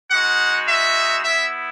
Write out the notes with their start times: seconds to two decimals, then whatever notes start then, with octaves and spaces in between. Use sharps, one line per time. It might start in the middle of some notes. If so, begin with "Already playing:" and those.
0.11 G#3 D#4 F#4 F#5
0.67 E5
1.23 B3 E4 E5